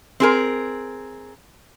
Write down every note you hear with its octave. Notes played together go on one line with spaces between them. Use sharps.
C4 G#4 A#4